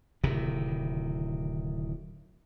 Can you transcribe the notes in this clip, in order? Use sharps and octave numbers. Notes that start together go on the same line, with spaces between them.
D1 C3 D#3